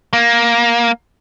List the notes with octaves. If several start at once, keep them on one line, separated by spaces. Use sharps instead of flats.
A#3